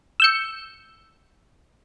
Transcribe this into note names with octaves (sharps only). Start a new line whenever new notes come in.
E6 G6 C#7